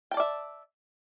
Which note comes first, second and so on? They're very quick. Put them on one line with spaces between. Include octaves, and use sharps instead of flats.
G5 A5 D5 E5